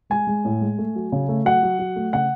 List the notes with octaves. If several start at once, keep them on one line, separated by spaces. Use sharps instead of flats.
G#3 G#5
G#3
A2
G#3
A3
F#3
C#3
A3
F#3 F#5
F#3
F#3
A3
C#3 F#5